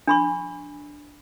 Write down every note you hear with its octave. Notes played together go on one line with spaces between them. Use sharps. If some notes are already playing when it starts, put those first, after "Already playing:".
D4 B5 C#6